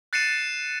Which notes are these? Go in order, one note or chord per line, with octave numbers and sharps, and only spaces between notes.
F#6 A6 C7 C#7 D#7 E7